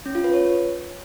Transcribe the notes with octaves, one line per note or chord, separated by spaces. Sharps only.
C#4
F4
B4
C#5